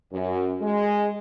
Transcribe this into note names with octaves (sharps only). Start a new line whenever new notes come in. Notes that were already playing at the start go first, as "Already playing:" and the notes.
F#2
G#3